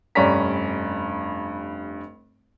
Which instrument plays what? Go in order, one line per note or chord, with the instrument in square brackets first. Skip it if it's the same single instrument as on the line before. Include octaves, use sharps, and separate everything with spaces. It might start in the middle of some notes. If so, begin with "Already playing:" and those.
[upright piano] F1 G2 C#4 D5 A#5 B6